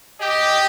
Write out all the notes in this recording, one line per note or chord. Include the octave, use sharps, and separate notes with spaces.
G4 D#5